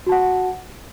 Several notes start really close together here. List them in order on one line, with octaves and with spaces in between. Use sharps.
F#4 A5 F#5